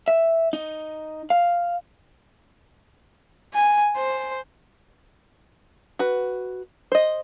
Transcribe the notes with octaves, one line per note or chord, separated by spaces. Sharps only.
E5
D#4
F5
G#5
C5
F#4 B4
C5 D#5